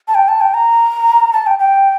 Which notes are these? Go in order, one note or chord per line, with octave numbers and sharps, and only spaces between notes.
A5
G5
A5
G5
A#5
A5
G5
G5